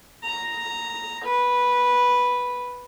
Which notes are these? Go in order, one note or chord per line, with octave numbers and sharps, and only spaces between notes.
A#5
B4